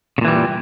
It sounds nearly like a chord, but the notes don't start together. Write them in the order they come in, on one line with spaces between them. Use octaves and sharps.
C#3 A#2 E3 G3